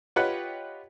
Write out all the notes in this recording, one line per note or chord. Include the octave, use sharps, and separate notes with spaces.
F4 G4 B4 C#5 D#5 F#5